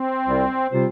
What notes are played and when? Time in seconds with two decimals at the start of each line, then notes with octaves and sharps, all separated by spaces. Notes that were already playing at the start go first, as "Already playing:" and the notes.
Already playing: C4
0.27 C2 C3 G3 F4
0.71 C3 G3 C4 F4 C5